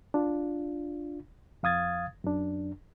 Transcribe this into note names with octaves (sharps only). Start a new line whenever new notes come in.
D4 F4
F2 F5 D#6 G#6 A6
F#2 D4